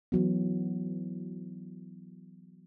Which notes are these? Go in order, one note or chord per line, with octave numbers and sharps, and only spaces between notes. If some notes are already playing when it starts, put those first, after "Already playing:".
E3 F#3 B3